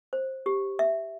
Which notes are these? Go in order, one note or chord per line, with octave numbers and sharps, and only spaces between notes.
C5
G4
E5